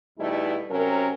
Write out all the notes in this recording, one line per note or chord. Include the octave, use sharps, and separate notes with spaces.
E2 B2 G3 A3 D#4 E4
C3 F#3 C#4 A#4